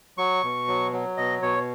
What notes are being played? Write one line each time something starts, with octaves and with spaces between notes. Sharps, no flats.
F#3 C#6
B2
F#3
F#3
B2 D#5
B2 C#5